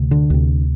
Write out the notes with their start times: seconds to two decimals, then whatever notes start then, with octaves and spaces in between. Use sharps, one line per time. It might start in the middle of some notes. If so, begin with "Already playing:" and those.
Already playing: D2 C3
0.11 D3
0.30 D2 C3